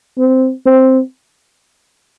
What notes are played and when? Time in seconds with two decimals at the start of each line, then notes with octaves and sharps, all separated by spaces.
0.17 C4
0.66 C4